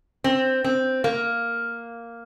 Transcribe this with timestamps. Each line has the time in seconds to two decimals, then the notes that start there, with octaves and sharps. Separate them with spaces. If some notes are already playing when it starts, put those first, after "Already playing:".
0.24 C4
0.64 C4
1.04 A#3